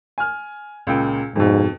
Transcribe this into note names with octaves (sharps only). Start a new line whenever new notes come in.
G#5 F6
C#2 A#2 G5
F2 G#2 B2